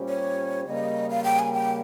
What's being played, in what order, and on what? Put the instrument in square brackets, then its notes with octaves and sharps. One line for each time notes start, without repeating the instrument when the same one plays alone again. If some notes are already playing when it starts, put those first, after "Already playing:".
Already playing: [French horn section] A#2 G3 C#4 G4 C5
[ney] C#5
[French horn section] C#3 G3 A#3 [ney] D#5
[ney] F5
G5
G#5
G5